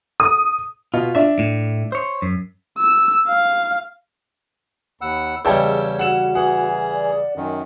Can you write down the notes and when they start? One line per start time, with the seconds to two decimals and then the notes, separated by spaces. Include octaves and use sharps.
0.20 D#6
0.94 B2 F4
1.15 D4 E5
1.39 A2
1.92 C5 C#5
2.22 F#2
2.79 E6
3.28 F5
5.01 D#2 F#5 B5 E6
5.45 E2 C#3 G3 C#5 D#5 G5 A5 E6
5.99 F#4 F#5 E7
6.35 E3 G#4 F#5
6.93 D5
7.37 F#2 D#3 C#4